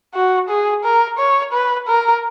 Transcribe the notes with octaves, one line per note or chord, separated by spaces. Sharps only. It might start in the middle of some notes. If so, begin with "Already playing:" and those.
F#4
G#4
A#4
C#5
B4
A#4